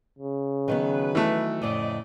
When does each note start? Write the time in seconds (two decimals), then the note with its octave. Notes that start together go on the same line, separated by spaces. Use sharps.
0.18 C#3
0.68 D#3 F#3 B3 B4
1.15 E3 A3
1.62 F2 A2 C#3 D5 D#5